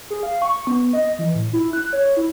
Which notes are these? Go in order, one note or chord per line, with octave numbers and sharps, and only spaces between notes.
G#4
F5
C#6
B3
D#5
E3
A2
E4
F#6
C#5
E4